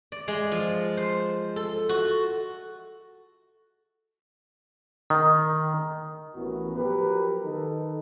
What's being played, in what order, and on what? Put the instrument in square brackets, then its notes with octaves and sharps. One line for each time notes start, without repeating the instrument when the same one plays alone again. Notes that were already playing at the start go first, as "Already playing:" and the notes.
[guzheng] D5
G#3
F3
C5
A4
F#4
[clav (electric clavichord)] D#3
[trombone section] A1 E3 B3 C#4 F#4 A#4
F3 F#3 G4 A#4 B4
D#3 D#4 A4